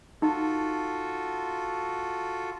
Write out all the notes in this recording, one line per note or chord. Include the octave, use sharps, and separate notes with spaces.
D#4 F4 F#4 A4